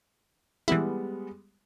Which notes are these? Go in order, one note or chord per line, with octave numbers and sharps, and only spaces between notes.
E3 G3 G#3 B3 E4